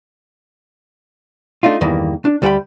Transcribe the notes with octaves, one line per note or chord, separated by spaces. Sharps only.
A3 D4 D#4 F4
E2 G2 D#3 E3 A#3
D4
D2 G3 C5 F#5 G5 B5